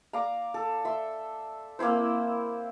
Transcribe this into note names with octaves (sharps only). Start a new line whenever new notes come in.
D5 F5 A#5
A4
E5 C6
A#3 C4 E4 C5